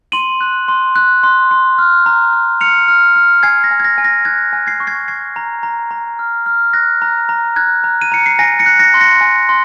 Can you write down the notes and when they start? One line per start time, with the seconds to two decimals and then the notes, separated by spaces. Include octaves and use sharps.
0.12 C6 D#7 F#7
0.41 F#6
0.68 C6
0.96 F#6
1.23 C6
1.51 C6
1.78 F6
2.06 A#5
2.33 F6
2.61 F6 C#7 F7
2.88 F6
3.16 F6
3.43 G#5 G#6 C7
3.64 A#6
3.71 G#5
3.80 G#6
3.84 A#6
3.98 G#5
4.05 A#6
4.25 F#6 G#6
4.53 G#5
4.67 G#6 C7
4.80 C#6
4.87 G#6 C7
5.08 C#6 G#6 C7
5.36 A#5
5.63 A#5
5.91 A#5
6.19 F6
6.46 F6
6.73 F#6 A#6
7.02 A#5
7.29 A#5
7.56 F#6 G#6
7.84 A#5
8.02 D#7
8.12 A#5 C#7
8.26 C7
8.39 G#5 A#6
8.59 A#6 C#7
8.66 F#6
8.79 A#6 C#7
8.94 C6
9.01 A#6 C#7
9.21 G#5
9.49 C6